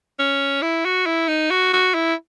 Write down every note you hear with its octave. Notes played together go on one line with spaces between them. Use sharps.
C#4
E4
F#4
E4
D#4
F#4
F#4
E4